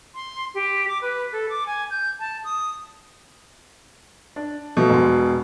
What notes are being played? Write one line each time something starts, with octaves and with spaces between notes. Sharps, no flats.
C6
G4
D6
B4
A4
D6
G#5
G6
A5
D#6
D4
B2 F3 A3
E1 C6